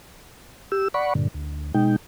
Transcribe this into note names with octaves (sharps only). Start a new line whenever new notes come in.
G4 E6
D5 F#5 B5 C#6
G2 A#2 D3
D2
B2 G#3 D#4 G5